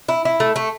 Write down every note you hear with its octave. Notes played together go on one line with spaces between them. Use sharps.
E4
E4
A3
A3